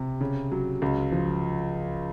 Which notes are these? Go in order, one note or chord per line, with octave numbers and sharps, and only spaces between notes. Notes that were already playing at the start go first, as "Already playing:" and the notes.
Already playing: C3
C#3
F#3
C#2
F3